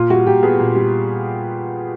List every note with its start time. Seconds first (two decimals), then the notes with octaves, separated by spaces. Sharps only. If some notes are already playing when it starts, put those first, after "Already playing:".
Already playing: A#2 F4
0.10 G3 F#4
0.27 A#2 G4
0.43 B3 G#4
0.59 A#2
0.75 G3